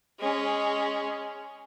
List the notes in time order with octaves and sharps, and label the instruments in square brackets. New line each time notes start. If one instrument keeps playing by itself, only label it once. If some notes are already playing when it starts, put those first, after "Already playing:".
[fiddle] G#3 C#4